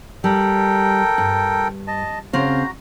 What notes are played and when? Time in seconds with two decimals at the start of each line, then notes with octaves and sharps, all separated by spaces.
0.24 G3 A4 A#4 G5
1.18 G2
1.87 D#5 A5
2.33 C#3 C4 F#4 F5 A#5